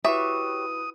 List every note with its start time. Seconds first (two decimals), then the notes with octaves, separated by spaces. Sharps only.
0.05 E4 F#4 G4 B4 C#5 E5 D#6